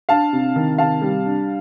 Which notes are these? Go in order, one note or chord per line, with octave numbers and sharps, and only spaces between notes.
D4 F5 A5
C3
D#3
C3 F5 A5
G3
D4